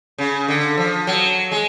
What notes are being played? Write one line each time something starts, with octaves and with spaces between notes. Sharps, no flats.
C#3
D3
F3
F#3
G#3